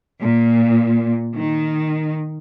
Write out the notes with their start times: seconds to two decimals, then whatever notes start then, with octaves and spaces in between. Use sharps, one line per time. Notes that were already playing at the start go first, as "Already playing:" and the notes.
0.22 A#2
1.36 D#3